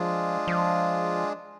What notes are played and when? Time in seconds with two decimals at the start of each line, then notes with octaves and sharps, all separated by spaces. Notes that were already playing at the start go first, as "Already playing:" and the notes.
Already playing: F3 G#3 D4 F4 G#4
0.48 F3